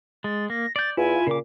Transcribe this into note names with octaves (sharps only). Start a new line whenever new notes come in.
G#3 A6
A#3 A#6
D5 G6 A6
E2 E4 F4 G#5
A#2 C#3 D6